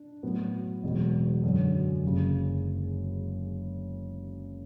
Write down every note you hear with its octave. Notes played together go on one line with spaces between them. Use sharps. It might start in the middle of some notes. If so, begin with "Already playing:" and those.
Already playing: D4
A2 F#3 B3
E1 E2 B2 F#3
F#2 D3 F#3
F#1 F#2 C#3